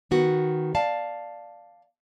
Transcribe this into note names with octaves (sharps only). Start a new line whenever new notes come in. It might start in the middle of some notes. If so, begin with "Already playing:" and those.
D#3 B3 F#4
D5 F5 A5